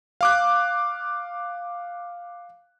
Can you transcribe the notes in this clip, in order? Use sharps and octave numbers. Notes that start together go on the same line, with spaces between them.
F5 D6 F#6